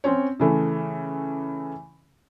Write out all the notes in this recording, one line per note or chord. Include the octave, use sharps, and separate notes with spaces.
C4 C#4 C#5
C#3 E3 A3